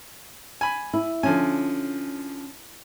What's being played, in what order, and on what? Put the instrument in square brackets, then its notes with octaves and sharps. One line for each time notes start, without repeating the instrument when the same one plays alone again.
[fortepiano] G#5 B5
[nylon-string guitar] E4
[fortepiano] D3 F3 G#5 [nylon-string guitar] C#4